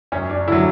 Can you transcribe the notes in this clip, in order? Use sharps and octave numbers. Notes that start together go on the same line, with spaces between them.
F#2 C#4
D4
D3 F#3 E4